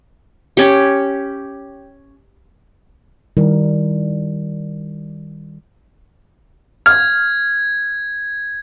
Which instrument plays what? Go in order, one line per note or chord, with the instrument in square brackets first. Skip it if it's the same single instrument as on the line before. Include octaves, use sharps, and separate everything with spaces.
[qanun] C#4 G4
[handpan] D#3 G3 E4 A#4
[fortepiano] F6 [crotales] G#6